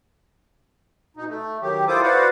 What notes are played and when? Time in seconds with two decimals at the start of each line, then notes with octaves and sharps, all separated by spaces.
1.17 B2 D#4
1.29 A3
1.61 D#3 F#3 G4
1.88 E4 F4 A4 C5 D6 D#6
2.02 F#4 B4 C5 D5 F5 F#5